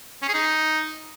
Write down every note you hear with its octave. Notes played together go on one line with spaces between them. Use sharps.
C#4
G#4
D#4